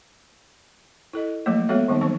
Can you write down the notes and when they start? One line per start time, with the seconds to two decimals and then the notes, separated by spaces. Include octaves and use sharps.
1.13 E4 A4 D#5
1.46 F3 F#3 A3 A#3 D#5
1.69 G#3 B3 F#4 A4 C#5 E5
1.88 D#3 G3 B3 C4 D#4
2.01 E3 F#3 C4 C#6